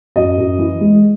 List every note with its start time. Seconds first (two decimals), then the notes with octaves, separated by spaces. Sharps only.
0.16 F#2 D#5
0.38 F#2
0.59 E3
0.81 G#3